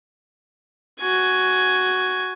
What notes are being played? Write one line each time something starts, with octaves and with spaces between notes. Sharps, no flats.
F#4 G#5